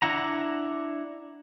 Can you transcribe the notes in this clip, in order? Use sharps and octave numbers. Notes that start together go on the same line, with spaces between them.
D4 E4 F#5 A#5